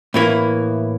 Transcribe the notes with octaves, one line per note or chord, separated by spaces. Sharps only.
A2 E3 A#3 E4